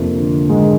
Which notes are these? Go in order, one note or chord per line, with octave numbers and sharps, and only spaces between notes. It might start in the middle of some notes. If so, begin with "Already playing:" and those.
Already playing: F2 C3 F3 A#3 D4
D3
G#2 D#3 G#3